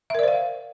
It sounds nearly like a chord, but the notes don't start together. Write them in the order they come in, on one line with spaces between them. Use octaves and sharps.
E5 A#4 D5 C5 F5